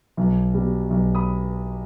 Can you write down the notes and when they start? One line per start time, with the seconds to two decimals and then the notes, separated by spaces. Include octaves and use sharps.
0.17 B1
0.54 B2 G3
0.90 B1
1.15 B5 D#6